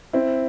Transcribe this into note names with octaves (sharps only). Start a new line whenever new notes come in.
C4 E4